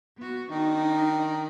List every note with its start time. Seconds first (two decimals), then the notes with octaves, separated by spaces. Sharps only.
0.17 B3 F#4
0.51 D#3 D4 D#4